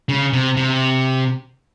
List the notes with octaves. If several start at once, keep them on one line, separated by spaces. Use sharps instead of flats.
C#3
C3
C3